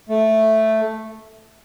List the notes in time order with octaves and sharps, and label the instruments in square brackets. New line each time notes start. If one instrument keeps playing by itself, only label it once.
[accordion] A3